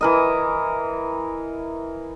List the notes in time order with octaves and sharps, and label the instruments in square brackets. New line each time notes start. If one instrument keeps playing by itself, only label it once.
[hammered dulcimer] E3 A#4 D#5